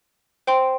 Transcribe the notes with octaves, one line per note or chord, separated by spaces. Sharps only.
C5 G5 C6